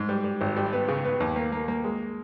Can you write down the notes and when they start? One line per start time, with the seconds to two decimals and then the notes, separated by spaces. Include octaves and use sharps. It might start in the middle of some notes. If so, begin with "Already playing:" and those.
Already playing: G#2
0.09 G3
0.24 G3
0.41 G#1
0.56 G3
0.73 B3
0.88 C#3
1.05 B3
1.20 D#2
1.36 A#3
1.52 A#3
1.68 A#3
1.84 G#3